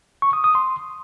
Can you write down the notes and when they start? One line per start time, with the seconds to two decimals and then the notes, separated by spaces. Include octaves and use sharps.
0.22 C#6
0.33 D#6
0.44 D#6
0.55 C6